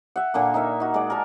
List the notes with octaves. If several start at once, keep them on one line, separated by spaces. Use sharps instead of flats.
E5 F#5
A#2 D3 A#3
D#4 A#4 E5
D#4 F#4
G#3 D5
A#4 A5